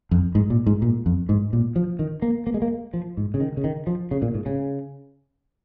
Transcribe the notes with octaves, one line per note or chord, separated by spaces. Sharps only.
F2
G#2
A#2
G#2
A#2
F2
G#2
A#2
F3
D#3
A#3
A#3
G#3
A#3
F3
G#2
C#3
D#3
C#3
D#3
F3
C#3
A#2
G#2
C#3